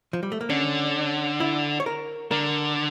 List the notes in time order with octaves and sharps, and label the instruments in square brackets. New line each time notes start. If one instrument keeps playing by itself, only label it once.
[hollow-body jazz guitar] F3
G3
A3
A#3
[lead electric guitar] D3 [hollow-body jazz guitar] C#4
[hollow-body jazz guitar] E4
C#5
A#4
[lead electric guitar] D3 [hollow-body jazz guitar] A#4